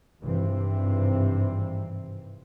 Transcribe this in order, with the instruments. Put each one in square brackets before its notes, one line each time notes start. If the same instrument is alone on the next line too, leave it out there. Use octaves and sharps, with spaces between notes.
[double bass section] G#1 G2 C3 E3 C4